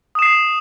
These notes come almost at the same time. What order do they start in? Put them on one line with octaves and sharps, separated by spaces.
D#6 E7 C7